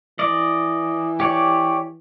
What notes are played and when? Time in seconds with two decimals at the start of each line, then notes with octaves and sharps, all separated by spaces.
0.19 E3 D5 D#5
1.20 G4 C#5 D5